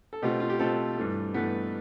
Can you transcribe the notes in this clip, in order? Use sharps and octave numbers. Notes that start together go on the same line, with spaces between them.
A4
B2 A3 C4 F4 G4
F4
G4
B2 A3 C4 F4 A4
G2 E3 A3
G2 E3 A3 B3 B4